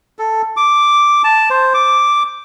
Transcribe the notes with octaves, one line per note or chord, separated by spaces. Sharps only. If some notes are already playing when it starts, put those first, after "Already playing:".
A4
D6
A5
C5
D6